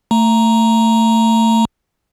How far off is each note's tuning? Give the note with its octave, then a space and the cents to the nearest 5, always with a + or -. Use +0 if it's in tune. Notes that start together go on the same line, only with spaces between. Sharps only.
A3 +25 A#5 +0